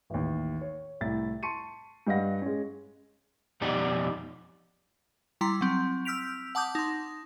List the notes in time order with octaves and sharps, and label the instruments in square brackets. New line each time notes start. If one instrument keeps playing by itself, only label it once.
[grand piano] A1 D#2
C#5
C2 A2 E4 A6
A5 C6 C#6 C#7 D#7
G2 G3 D#5 F5 F#5 A#6
G#3 C#4
[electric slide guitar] F2 B2 D#4 G4 D5 G#5
[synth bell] G3 E4 A#5 C6
F#3 C4
E6 F6 G6 B6 D7 F7
F#5 A5 D6 D#6 G6
D#4 C6